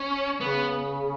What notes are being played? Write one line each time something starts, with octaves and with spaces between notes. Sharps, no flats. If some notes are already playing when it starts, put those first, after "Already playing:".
Already playing: C#4
C#3 B3